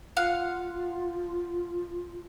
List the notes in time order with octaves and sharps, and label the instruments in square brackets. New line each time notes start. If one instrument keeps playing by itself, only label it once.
[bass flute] F4 [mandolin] F5 F#5